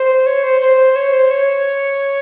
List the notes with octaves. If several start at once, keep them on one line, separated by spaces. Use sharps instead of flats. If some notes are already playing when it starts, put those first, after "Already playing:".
Already playing: C5
C#5
C5
C5
C#5
C5
C#5